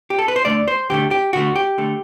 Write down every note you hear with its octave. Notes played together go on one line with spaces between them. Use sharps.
G4
A4
B4
C5
D2 D3 A3 D5
C5
D2 D3 A3 G4
G4
D2 D3 A3 F#4
G4
D3 A3